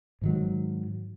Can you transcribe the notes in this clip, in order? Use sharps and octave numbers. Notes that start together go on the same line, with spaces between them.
G#2 D#3 F#3